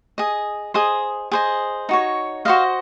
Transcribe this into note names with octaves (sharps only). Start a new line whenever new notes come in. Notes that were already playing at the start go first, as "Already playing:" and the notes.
G#4 D#5
G#4 C5 D#5 D#6
G#4 C5 D#5
D#4 F#4 C#5
F#4 C5 D#5 F5